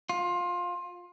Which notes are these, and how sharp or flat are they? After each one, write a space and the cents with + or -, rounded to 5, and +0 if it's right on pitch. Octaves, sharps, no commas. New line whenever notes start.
F4 +20